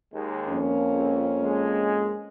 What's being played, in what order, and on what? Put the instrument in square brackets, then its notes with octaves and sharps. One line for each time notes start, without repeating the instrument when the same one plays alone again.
[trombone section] D#2 G#3
[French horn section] F2 A#3 C#4
[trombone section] C#2
G#3